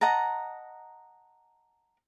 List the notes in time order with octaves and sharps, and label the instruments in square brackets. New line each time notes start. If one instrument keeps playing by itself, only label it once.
[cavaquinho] D#5 F#5 A5 A#5